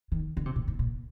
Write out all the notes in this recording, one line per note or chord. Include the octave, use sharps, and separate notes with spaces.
D#3
D3
C3
A#2
G#2
A#2